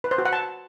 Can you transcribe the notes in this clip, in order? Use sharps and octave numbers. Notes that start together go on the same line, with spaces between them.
B4
C5
F#4
F#5
A5